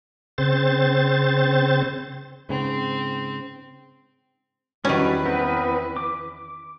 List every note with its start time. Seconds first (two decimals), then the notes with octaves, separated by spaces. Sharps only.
0.38 C#3 C4 C5 A6
2.49 G#2 C#3 C4
4.85 E2 D#3 F#3 G3 C#4 D4 B4
5.26 B3 C4 A#4
5.97 D6